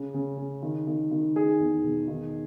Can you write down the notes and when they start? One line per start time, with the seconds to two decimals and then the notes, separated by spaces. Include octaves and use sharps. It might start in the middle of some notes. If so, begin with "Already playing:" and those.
Already playing: C#3
0.14 C#3
0.37 C#3
0.62 D#3
0.87 D#3
1.11 D#3
1.35 D#4 G#4
1.60 E2
1.84 B2
2.08 D#3